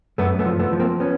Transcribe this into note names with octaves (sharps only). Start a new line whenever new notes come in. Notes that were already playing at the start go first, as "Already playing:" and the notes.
F#2 A3 B3
A3 B3
F3
A3 B3
F3
A#3 C4
B3 C#4